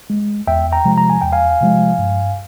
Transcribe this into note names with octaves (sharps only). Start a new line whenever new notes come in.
G#3
E2 E5 G5
G5 A#5
C3 F3 G#3
A#5
G#5
E2 G5
F5 G#5
C3 F3 G#3
G2